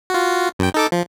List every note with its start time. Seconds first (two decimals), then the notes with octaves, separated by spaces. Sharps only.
0.10 F4 F#4
0.59 F#2 G5
0.74 D#4 A4 D6
0.92 F3